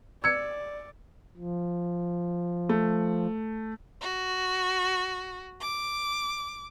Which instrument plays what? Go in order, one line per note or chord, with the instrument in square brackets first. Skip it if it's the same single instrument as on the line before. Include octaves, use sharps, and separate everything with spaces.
[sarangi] D5 [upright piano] E6 C#7 [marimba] G#6
[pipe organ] F3
[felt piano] A3
[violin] F#4
D6